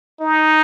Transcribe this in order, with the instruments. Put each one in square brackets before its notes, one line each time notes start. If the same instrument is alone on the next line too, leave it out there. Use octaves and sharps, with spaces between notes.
[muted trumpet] D#4